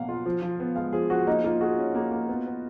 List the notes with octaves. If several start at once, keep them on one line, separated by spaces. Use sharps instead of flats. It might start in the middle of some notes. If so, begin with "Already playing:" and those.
Already playing: B2 F#3 A#3 F5 F#5
F4
F3
F3
B3
G#3 F5
F3 G#4
F3 F#4
A#3 D#4
A#3 F4
F#4 G#4
C#4
A#3
A#3
B3
B3